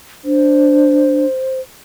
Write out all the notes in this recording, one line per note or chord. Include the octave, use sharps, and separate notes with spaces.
D4 C5